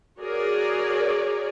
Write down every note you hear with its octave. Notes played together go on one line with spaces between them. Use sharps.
F#4 G#4 A#4 C#5 D5